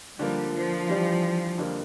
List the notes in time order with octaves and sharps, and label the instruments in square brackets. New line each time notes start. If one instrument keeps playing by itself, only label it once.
[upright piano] D3 F3 A#3 [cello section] G3
[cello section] F3
[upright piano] E3 G3 D4 G4
F2 D3 G3 A#3